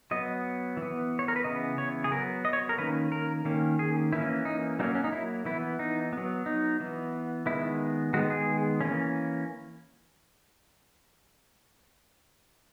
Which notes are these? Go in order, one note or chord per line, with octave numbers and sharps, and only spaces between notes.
F#3 B3 D#5
E3
B3
C#5
A#4
B4
C#3 E3 B3 D#5
C#5
G#4
F#3 B3 A#4
D#5
C#5
A#4
D#3 A#3 C#4 B4
A#4
D#3 A#3 C#4
G#4
E3 A#3 C#4 E4
D#4
F#3 A#3 C#4 D#4
C#4
D#4
E4
E3 B3 E4
D#4
F#3 B3
D#4
E3 B3
D#3 G#3 B3 E4
D#3 G#3 B3 F#4
G#4
E3 A#3 C#4